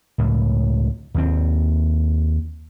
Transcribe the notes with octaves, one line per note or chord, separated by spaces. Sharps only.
C#2 A2
D#2 C4